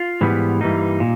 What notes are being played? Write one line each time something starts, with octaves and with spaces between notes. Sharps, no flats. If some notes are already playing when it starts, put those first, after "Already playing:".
Already playing: F4
G#2 E3 G3 B3
G2 E3 G3 A#3 D#4
A#2